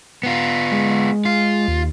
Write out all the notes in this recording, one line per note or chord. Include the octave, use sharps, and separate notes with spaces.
B3 F4
G#3
F4
D#2